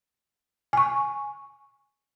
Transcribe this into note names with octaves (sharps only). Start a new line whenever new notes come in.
G#5 C#6